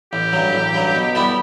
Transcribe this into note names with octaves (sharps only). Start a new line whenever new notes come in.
A1 G4
G2 F#3
A1
G2 F#3
B2
G3 B3 E4 A4